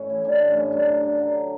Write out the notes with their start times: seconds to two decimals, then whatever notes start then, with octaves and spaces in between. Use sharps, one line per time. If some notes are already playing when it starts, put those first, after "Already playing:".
Already playing: A2 C#4
0.10 E3
0.25 G3 D4
0.40 A2
0.48 C#4
0.56 A2
0.72 F#2 D4
0.87 F#2
1.04 D3
1.19 F#3